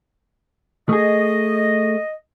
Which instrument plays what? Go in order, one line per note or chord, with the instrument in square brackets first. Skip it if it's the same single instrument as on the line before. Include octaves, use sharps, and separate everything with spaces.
[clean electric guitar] A3 G#4 [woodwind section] D#5